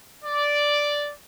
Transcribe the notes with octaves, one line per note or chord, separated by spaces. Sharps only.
D5